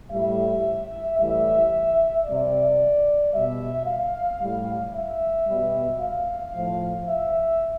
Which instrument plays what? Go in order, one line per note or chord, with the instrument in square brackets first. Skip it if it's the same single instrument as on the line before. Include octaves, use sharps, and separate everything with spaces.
[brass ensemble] A2 G3 E5
A2 E3 G3 E5
C3 G3 D5
B2 G3 E5
F5
A2 G3
E5
B2 G3
F5
A2 F3
E5